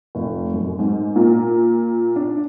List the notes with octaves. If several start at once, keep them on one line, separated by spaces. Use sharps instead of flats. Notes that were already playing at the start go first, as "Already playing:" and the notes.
F1
F#2
G#2
A#2
D4